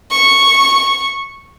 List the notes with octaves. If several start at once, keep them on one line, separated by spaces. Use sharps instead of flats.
C#6